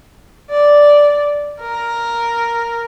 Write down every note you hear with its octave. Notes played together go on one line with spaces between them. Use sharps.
D5
A#4